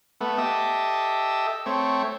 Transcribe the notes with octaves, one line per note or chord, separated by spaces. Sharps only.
A3 B3
G4 A4 D#5 E5
A3 C4 C#5